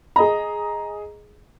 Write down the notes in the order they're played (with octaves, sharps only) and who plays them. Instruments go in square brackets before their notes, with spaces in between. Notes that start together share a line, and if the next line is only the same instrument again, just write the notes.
[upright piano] G#4 D#5 A#5